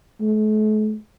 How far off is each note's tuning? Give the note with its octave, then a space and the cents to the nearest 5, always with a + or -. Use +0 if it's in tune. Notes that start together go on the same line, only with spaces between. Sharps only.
A3 -45